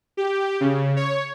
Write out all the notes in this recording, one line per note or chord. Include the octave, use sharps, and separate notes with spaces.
G4
C#3
C#5